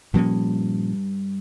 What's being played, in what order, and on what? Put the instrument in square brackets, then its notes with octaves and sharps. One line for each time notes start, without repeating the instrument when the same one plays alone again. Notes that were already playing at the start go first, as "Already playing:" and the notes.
[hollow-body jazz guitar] G2 [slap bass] A#2 F3 A#3 C#4